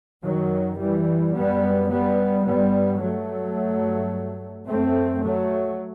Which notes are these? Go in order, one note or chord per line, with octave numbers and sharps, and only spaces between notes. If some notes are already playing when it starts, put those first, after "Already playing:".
F#2 D#3 F#3
E3 G3
F#2 G3 B3
G3 B3
G2 G3 B3
F#3 A3
G2
F#2 A3 C4
F#3 A3